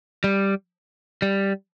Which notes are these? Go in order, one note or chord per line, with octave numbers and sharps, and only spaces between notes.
G3
G3